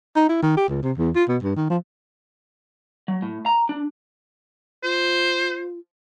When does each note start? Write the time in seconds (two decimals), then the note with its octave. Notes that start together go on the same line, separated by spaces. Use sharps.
0.16 D#4
0.29 E4
0.42 D#3
0.57 G4
0.69 C#2
0.82 C3
0.98 E2
1.15 F4
1.29 B2
1.43 G2
1.56 D#3
1.70 F3
3.08 F#3
3.22 A2
3.46 A#5
3.69 D4
4.83 F4 C5